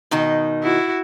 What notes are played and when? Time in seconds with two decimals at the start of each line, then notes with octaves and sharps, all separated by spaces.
0.11 B2 D#3 D#4
0.63 E4 F#4